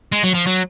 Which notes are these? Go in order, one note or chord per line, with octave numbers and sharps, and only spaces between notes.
G#3
F#3
F3
F#3